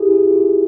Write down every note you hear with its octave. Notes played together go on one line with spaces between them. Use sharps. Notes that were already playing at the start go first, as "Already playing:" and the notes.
Already playing: E4 G4 G#4
F#4
F4